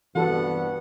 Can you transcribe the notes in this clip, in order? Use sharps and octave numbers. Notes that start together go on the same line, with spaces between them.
C2 G2 E3 B3 F#4 A4 F#5